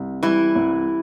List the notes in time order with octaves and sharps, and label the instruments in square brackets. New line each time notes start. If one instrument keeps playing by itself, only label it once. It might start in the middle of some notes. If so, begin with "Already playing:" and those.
Already playing: [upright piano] C2
[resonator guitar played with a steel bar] E3 E4 [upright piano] G3
[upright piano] C2